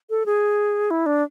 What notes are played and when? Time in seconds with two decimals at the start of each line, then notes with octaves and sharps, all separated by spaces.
0.10 A4
0.26 G#4
0.91 E4
1.06 D4